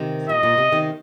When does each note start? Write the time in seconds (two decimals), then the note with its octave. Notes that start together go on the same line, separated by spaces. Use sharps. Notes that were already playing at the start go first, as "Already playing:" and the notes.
Already playing: C3 D#3
0.29 A#2 D#5
0.43 A#2
0.58 C3
0.72 C3 D#3